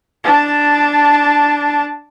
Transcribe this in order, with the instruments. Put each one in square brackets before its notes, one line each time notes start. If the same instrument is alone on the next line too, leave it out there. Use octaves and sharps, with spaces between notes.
[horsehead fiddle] D4 A5